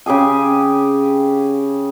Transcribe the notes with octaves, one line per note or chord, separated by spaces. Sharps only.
C#3 G4 G#4 G#5